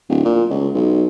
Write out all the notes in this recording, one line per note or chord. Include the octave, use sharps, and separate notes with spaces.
D1
A#2
C#2
B1